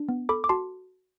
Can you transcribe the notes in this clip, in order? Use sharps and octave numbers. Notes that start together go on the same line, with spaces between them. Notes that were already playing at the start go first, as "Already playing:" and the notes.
Already playing: D4
B3
A4 B5 D6
D6
F#4 A5 C6